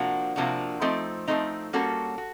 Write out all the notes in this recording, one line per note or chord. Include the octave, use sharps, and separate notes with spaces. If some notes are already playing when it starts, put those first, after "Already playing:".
Already playing: C3 F3 A#3 D4 F#4
C3 F3 A#3 D4 F#4
F3 A3 C4 D#4
F3 A3 C4 D#4
G3 A#3 C#4 F#4 A4
F#4